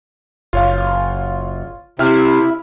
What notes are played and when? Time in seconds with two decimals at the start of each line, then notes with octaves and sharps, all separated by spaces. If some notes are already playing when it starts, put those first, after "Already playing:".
0.53 F#1 F4 C#5 F5
1.99 C3 E4 E5 G5 F6